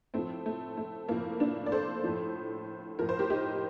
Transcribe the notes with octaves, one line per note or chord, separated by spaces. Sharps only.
A2 F3 A3 C4
A3
A3
A2 F3 A#3
A#3 D4
D5
A4 C5
A2 F3
A2 F3 A#4
C5
G4 A#4
D#4 G4